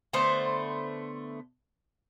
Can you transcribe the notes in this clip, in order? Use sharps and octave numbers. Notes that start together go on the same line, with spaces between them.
D3 A3 B3 C5